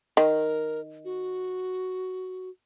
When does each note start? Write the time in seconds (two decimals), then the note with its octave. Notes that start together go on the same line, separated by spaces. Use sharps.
0.17 D#3 A#4
1.05 F#4